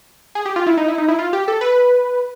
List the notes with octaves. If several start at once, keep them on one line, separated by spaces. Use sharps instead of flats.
G#4
G4
F4
E4
D#4
E4
D#4
E4
F4
G4
A4
B4